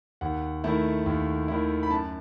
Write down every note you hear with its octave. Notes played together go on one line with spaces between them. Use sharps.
D#2 F#5
D#3 A3 E4
D#2
D#3 A3 E4
B5
F#2 A5